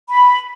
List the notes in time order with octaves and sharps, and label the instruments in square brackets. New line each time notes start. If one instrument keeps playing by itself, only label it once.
[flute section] B5